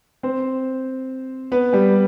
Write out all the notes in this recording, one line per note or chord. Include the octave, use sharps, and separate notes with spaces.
C4 C5
B3 B4
G3 G4